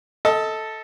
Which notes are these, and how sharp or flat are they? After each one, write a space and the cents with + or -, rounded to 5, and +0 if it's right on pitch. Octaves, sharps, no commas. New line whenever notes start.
A4 +0 D#5 +30 A5 +0